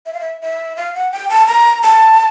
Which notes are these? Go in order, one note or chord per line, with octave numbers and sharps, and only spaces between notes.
E5
F5
E5
E5
F5
F#5
G5
A5
A#5
A5